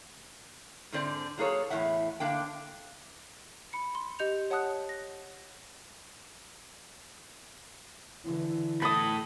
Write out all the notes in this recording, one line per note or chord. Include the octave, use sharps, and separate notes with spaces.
G#2 D3 C4 D5
F#3 A#3 G#4 A4 C#5
E2 A2 E5 F#5
D3 A#3 D4 G5
B5 C#7
C6
G4 D#5 G6 C#7 F7
C#5 F#5 A5 D#6 F#6
A#6
D3 E3 E4
A2 A4 B5 D#6